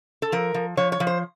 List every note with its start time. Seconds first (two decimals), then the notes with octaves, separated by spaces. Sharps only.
0.22 A4
0.32 F3 A#4
0.54 F3
0.77 F3 C#5
0.92 C#5
1.00 F3
1.07 C5